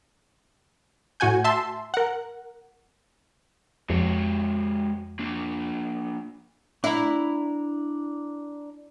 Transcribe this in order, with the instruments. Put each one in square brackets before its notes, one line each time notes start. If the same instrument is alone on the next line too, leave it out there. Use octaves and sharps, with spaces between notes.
[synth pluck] A2 F#4 F#5 G#5 G6
E5 A5 C6 E6
A#4 F#5
[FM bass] F2 [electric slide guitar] G#3 F#4 C#5
[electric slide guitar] A#3 D4
[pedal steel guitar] D4 A#5 [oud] E4